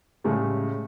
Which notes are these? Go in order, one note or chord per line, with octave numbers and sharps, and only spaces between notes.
A2 C#3 G3 G#3 C#4